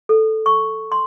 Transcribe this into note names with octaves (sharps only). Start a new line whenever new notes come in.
A4
C#6
C6